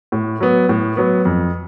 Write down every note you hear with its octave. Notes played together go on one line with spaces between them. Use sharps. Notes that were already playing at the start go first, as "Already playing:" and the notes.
A2
F#3 B3
A2
F#3 B3
F2